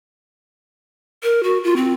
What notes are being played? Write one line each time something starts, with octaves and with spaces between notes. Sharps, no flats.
A#4
F#4
F4
C4